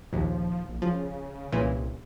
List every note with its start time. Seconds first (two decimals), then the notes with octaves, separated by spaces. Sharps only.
0.13 A#1 D#2 F3
0.69 A#1
0.82 C#3 F3
1.52 C2 A#2 C#3 E3